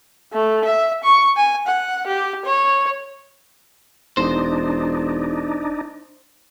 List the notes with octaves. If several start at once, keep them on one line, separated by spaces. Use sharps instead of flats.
A3
E5
C#6
G#5
F#5
G4
C#5
E1 D4 D#4 C5